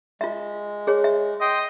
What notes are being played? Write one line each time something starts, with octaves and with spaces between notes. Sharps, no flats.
G#3 F4 E5
G#4 C#5
E5
D#5 G5 C6